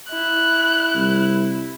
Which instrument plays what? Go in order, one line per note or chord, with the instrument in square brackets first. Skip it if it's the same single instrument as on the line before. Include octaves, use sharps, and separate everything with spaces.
[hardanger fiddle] E4 [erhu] F#6
[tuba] C2